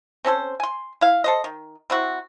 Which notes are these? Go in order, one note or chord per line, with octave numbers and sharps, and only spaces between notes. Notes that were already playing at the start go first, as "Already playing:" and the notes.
C4 C#4 A4 C5
G#5 C6
E4 F5
A4 C5 D#5
D#3
C4 E4 F#4